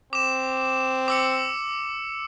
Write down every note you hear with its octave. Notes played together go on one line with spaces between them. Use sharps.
C4 D6 E7
D6 E6 C#7